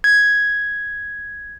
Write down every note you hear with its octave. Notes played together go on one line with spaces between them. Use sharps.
G#6